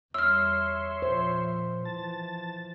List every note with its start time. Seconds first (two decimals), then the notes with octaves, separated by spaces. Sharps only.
0.14 E2 G3 C#5 E5 C6 E6 F6
1.02 A#2 F3 C5
1.85 E3 F3 A5 A6